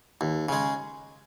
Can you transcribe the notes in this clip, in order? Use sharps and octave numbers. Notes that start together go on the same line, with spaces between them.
D#2
C#3 G#3